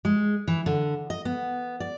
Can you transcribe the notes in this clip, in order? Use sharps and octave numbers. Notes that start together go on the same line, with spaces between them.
G#3
E3
D3
D#5
B3
D5